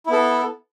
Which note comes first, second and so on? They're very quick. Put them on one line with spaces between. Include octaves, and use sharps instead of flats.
E4 B3 A4